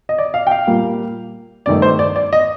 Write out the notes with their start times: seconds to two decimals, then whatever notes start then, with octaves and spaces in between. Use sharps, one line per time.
0.09 D#5
0.18 D5
0.34 F5
0.47 G5
0.51 F5
0.67 A#2 G3 A#3
1.66 G2 D#3 A3 D5
1.82 C5
1.99 D5
2.16 D5
2.33 D#5